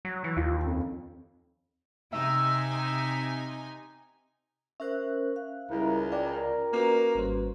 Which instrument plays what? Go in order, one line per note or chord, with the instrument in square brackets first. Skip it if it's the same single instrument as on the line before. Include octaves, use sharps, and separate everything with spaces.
[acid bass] F#3
E3
[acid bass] D#2 [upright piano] F4
[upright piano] F2
[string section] C3 D#4 G#5 [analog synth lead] E5
[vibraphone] C#4 A#4 C5 [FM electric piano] E5 F#6
[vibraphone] F5
[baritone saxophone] C#2 [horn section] G3 E4 A#4
[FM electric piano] F4 D5 [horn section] A#4 [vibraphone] G5
[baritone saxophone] A#3 [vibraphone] C#4 F#4 B4
[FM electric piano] G#1 G3 C5